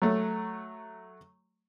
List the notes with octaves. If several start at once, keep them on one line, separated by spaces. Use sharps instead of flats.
F#3 A3